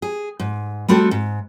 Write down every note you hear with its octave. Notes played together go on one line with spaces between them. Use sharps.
G#4
G#2
G3 A3 C4 F#4 A4
G#2